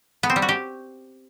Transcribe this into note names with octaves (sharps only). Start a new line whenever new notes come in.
B3
C4
G3
F#4
G4